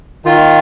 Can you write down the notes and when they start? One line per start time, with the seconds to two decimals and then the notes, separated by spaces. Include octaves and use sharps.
0.25 D#3 F4